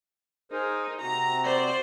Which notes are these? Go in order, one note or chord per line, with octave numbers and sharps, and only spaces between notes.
D#4 G#4 A#4 C5
C3 C4 F#4 A#5
C5 D5